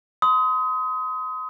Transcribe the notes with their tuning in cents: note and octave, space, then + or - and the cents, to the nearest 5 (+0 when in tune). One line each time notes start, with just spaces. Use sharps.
C6 -35 D#6 +25